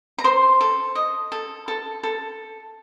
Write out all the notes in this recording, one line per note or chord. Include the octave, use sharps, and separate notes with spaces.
A#5
C5 C6
A4
D#5
A4
A4 A5
A4